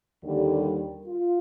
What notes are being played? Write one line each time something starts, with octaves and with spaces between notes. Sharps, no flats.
D#2 D3 G3 A#3
F4